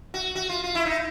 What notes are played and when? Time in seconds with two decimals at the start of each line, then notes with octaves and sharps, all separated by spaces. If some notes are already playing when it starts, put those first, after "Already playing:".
0.14 F#4
0.35 F#4
0.49 F4
0.64 F4
0.75 E4
0.86 D#4